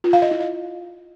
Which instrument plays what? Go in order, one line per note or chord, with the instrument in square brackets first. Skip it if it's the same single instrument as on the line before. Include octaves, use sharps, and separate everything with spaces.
[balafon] F4
F5
D#5
E4
D#5